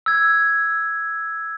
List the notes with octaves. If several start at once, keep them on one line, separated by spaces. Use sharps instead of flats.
E6 G#6